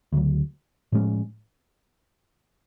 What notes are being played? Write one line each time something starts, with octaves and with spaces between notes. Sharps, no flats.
D2 C#3 F#3
A2 F3 G#3 C#4